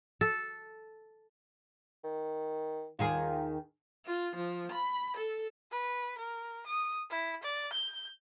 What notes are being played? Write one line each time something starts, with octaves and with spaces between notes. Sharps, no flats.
A4
D#3
D#2 D#3 F4 G#4
F4
F3
B5
A4
B4
A#4
D#6
E4
D5
G6